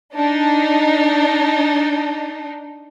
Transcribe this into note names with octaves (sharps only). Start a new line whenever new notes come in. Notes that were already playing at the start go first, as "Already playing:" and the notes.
D4 D#4